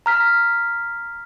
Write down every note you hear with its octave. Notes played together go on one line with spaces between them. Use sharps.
A#5 F6 B6